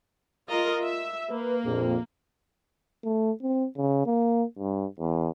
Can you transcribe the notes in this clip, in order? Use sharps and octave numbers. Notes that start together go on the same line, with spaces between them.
F4 A#4 D#5
E5
A#3 B4
A#1 F2
A3
C4
C#3
A#3
G2
E2